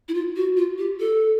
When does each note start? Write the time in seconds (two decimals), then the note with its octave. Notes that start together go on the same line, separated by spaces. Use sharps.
0.08 E4
0.14 F4
0.36 F#4
0.57 F4
0.78 G4
1.00 A4